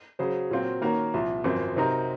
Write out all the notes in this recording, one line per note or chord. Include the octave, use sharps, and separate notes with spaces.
C#3 F#3 C#4 G#4 C5
A#2 F#3 C4 F4
D#3 A#3 C#4 F#4 A#4
C2 A#2 F3
G#1 F#2 F3 C4
C3 F#3 C4 D#4 A#4